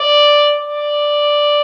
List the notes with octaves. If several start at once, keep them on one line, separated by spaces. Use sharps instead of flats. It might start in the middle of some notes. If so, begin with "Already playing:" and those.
Already playing: D5
D5